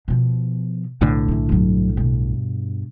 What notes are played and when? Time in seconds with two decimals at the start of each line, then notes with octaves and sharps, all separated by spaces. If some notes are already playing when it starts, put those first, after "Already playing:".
0.08 B2 F3
1.01 B1 A2 D3
1.28 E3 F#3
1.49 G2 F#3
1.97 G2 B2